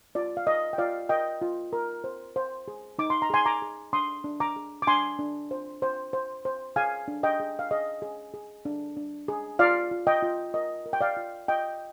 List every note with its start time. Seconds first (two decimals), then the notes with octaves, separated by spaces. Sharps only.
0.15 F4 D5
0.37 F5
0.47 A#4 D#5
0.73 G5
0.78 F4 D5 F5
1.09 A#4 D#5 G5
1.41 F4
1.73 A#4
2.04 C5
2.36 C5
2.68 G#4
2.99 D#4 D6
3.10 C6
3.22 A#5
3.30 G#4 G#5 C6
3.46 A#5 D6
3.62 G#4
3.93 D4 C6 D#6
4.24 D4
4.40 A#5 D6
4.56 G#4
4.82 D6
4.87 D4 G#5 C6
5.19 D4
5.51 C5
5.82 C5
6.13 C5
6.45 C5
6.76 G#4 F5 G#5
7.08 D4
7.23 D#5 G5
7.40 G#4
7.59 F5
7.71 G#4 D#5
8.02 G#4
8.34 G#4
8.65 D4
8.97 D4
9.28 G#4
9.59 F4 D5 F5
9.91 F4
10.07 D#5 G5
10.23 F4
10.54 A#4 D#5
10.86 A#4
10.93 G5
11.01 D5 F5
11.17 F4
11.48 F4 D#5 G5